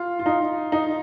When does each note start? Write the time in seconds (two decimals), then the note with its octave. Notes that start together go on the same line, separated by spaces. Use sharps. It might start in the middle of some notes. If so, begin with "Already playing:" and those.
Already playing: F4
0.19 F4
0.26 D#4
0.72 D#4